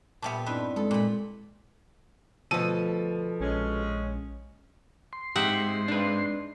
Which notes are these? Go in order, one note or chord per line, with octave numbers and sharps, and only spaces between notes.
A#2 G3 B3 E5 A5
G2 C4 D#4 E4 B4 D5
G#3 A4
A#2 B5
D2 B2 F3 A4 D#7
A#1 G#3 C#4
C6
G#2 G#3 C4 D#4 G4 E5 F#5
D4 B4